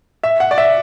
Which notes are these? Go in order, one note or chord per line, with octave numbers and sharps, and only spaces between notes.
E5
F#5
D5
E5